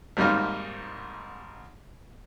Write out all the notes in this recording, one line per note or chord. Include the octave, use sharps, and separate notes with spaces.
G#1 G#2 G3 A#3 D#4 F5